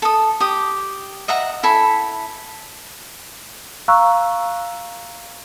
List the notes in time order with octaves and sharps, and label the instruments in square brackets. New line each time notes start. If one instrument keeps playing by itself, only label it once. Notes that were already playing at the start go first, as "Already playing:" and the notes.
[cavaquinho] A4 D#6
G4 D#6
D#5 E5 F#5 A#5
E4 A4 G#5 B5
[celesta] F5 A#5 C#6 E6 F#6